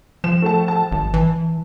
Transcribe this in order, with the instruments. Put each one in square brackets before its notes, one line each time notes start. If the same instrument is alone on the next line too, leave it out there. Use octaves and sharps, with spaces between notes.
[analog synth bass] F3 [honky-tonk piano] E7
[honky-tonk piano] A3 A5
A5
[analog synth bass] G#1
E3